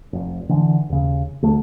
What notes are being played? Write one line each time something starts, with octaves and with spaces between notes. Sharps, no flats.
F1
D3 E3
D#2 C#3
D2 A3